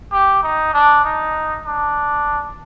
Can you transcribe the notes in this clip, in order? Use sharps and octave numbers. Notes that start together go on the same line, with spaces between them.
G4
D#4
D4
D#4
D4